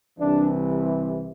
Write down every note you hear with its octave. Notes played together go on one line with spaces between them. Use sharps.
C2 C3 E3 D4